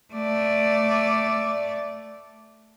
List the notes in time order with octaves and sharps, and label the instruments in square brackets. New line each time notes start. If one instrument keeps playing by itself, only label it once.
[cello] A3 D5